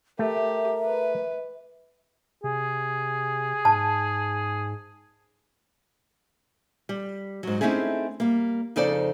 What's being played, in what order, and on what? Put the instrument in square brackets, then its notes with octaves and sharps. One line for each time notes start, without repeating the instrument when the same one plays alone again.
[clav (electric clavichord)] A3 [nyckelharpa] G4 [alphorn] A#4 [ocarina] E5
[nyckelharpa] B4
[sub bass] C3 [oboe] G#4
[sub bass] G#2 [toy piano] A5
[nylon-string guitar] G3
G#2 F#3
A3 C4 C#4 D#4 E4 G#4
G3 A#3
F2 C#3 D#4 A4 C5 D5